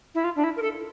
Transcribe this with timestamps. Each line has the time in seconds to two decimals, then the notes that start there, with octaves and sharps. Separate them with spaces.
0.14 E4
0.24 F4
0.36 D4
0.43 E4
0.56 A#4
0.62 A4